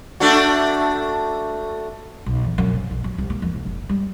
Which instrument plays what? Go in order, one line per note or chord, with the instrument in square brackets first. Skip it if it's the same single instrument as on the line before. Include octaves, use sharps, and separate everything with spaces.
[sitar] A3 D4 F#4
[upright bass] B1
E2
F#2
C3
B1
F#2
C2
A#3
F2
C2
F#1
G3